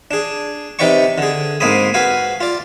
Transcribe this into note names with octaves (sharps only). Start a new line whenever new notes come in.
D4 G#4
C3 D#4 B4 D5 G5 C#6
D3 G#4
G#2 A#3 C4 G#5 B5 D#6
F#4 B4 F5 G#5
F4 D5